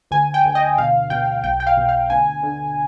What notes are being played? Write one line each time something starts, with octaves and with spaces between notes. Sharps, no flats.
D2 G#5
G5
D2
D#5
B2 F5
B2 G5
B1 G5
G5
F5
B2
F5
D2 G#5
D3